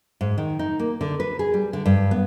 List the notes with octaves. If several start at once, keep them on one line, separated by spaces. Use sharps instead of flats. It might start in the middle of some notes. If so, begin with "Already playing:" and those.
G#2
D#3
D#4
A#3
D3
B4
G#4
G3
D3
G2
B3